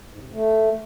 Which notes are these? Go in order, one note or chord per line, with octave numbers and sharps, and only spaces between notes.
G#2
C3
F2
A3